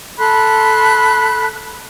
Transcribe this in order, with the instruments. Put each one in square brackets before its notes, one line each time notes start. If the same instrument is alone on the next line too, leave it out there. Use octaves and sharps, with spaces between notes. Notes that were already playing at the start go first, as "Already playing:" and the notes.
[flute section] A4 B5 C6 F#6